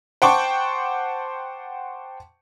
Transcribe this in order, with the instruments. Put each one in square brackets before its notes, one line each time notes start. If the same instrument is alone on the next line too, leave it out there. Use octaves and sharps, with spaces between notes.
[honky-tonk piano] C5 F#5 G5 A5 C#6 D6